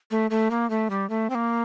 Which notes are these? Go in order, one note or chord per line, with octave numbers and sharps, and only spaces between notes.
A3
A3
A#3
A3
G3
A3
C4
A#3